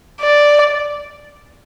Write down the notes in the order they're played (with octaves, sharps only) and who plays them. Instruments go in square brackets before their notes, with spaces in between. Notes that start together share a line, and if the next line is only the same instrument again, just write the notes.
[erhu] D5